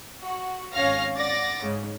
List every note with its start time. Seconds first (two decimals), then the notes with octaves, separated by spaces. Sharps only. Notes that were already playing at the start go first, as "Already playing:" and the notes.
0.21 F#4
0.72 G#1 C#4 C#5 F5 F6 A#6
1.16 D5 F#5 D6 A6 A#6
1.61 G#2 C#3